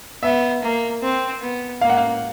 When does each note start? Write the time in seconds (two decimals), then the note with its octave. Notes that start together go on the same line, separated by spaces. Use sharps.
0.23 B3 E5
0.63 A#3
1.02 C4
1.42 B3
1.81 A#3 F5
1.90 F#5
1.97 F5